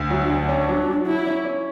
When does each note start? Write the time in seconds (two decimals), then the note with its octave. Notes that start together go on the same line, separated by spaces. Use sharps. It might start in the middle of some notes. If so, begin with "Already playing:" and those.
Already playing: D2
0.10 F#3
0.20 D4
0.30 D2
0.48 C#4
0.68 F#3
0.86 F#3
1.06 F#3 E4
1.26 C#4
1.45 C#4